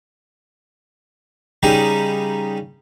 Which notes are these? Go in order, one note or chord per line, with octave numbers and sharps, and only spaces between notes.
C#3 G3 D#4 G4